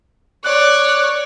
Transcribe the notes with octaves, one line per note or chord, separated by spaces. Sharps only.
C#5 D5 F#6